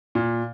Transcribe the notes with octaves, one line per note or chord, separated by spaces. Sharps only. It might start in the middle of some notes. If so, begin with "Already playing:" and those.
A#2